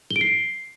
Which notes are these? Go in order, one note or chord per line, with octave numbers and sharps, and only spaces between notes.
G7
D7
C7